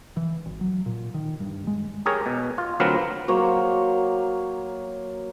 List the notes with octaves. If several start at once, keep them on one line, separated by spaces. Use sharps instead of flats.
E3
G#1
F#3
A#2
D#3
G2
G#3
G4 G#4 A#4 C#5
B2
F4
D2 F#3 C4 F4 A#4 B4
F#3 A#3 C5 C#5